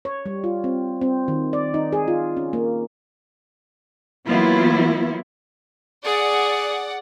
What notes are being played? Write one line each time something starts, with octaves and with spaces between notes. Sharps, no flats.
C#5
G3
F4
C4
C4
D#3
D5
D#4
G#4
F4
C#4
A#3
E3 F#3 A#3 B3 E4 F4
G#4 D5 F#5